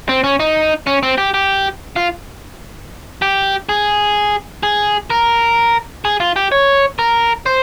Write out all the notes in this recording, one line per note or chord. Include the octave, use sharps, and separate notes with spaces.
C4
C#4
D#4
C#4
C4
G4
G4
F4
G4
G#4
G#4
A#4
G#4
F4
G4
C#5
A#4
C5